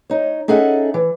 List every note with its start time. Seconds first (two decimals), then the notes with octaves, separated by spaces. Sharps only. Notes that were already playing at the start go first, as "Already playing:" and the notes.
0.10 D#4 C#5
0.48 C#4 D#4 G#4 A4 E5 F#5
0.94 E3